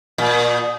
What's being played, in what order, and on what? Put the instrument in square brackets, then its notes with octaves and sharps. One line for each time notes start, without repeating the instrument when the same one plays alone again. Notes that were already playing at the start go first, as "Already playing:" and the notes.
[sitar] A#2